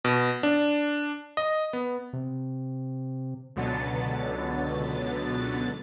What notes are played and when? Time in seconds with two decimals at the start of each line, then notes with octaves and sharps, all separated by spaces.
0.05 B2
0.43 D4
1.37 D#5
1.73 B3
2.13 C3
3.56 C#2 B2 D3 F#3 B3 A6